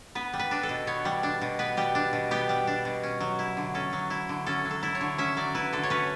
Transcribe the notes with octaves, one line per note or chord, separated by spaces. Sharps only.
B3 B4
G3
B4
D4
A4
B2
B3 C#5
G3
D4
B2
B3 B4
G3 G4
D4
B2
B3 G4
G3
D4
B2
C#4
F#3
E4
D3
C#4 A4
F#3
E4
D3
C#4 A4
F#3
A4
E4
C#5
D3
C#4 E5
F#3 D5
E4 B4
D3 A4
C#5
C#4 B4